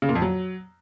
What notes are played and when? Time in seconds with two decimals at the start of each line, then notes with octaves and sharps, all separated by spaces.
0.02 C#3
0.09 A#2
0.15 F2
0.22 F#3